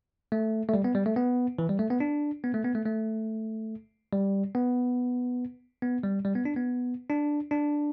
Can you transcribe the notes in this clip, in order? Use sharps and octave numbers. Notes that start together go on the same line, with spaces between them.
A3
A3
G3
B3
G3
A3
B3
E3
G3
A3
B3
D4
B3
A3
B3
A3
A3
G3
B3
B3
G3
G3
B3
D4
B3
D4
D4